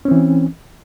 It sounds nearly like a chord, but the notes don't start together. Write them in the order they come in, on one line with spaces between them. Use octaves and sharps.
C#4 C4 E3